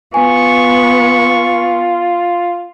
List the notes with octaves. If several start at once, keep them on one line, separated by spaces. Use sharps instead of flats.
B3 F4 G#5 C#6